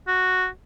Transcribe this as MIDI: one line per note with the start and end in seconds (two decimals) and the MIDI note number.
0.08 0.46 66